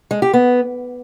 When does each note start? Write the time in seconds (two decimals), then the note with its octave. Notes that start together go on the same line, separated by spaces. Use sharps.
0.11 G#3
0.22 G4
0.33 B3